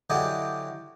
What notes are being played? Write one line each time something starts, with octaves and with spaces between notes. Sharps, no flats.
D3 F#3 E4 G4 D#5 G#5